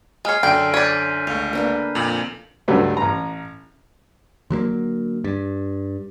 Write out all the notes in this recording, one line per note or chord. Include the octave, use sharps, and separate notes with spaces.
G#3 C#5 G#5 F6 C7
F#2 D3 A4 G5 C6 D7
C#5 D5 G6 B6 D#7
C#2 A3 F5
A#3 D4 B4
F2 A#2 F7 F#7
C#2 G2 F#3 G3 A3
A1 A#5
D3 F#3 G#3 A#3
G2